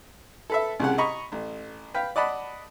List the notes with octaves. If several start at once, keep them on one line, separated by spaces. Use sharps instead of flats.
A4 B4 E5
C2 C#3 F#5
D#5 A#5 B5 C#6
A1
B4 F5 G5
D5 D#5 F#5 A5 B5